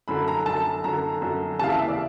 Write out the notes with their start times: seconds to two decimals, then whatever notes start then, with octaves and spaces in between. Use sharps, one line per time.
0.08 F#2 D3 B5
0.28 A#5
0.46 F#2 D3 A5
0.84 F#2 D3 A#5
1.22 F#2 D3
1.59 D#2 C#3 E3 F5 A5
1.69 E5
1.79 E5
1.88 D5